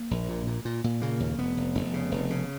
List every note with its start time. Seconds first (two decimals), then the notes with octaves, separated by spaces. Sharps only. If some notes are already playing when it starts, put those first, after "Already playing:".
Already playing: A#3
0.11 A#1
0.29 A#2
0.47 A#2
0.65 A#2
0.84 A#2
1.02 C#3 A#3
1.20 D#2
1.38 F1 B3
1.57 F1
1.75 F1
1.94 C#3
2.12 F1
2.30 C#3